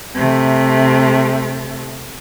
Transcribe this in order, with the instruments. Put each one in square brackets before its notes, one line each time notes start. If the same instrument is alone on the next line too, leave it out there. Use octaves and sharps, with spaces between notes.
[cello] C3 A3